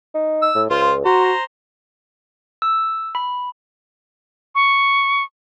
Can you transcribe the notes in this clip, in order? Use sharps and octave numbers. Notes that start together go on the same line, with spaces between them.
D#4
E6
A2
C#2 F4 C5
F#4 C5 A#5
E6
B5
C#6